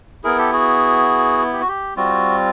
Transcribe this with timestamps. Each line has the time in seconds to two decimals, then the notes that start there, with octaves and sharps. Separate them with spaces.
0.24 B3 E4 G#4 A#4
0.38 G4 A4
0.52 F#4 G#4
1.53 G4
1.61 F#4
1.68 G4
1.97 G3 C4 F4 F#4